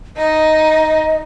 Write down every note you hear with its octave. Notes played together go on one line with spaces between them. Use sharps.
D#4 D#5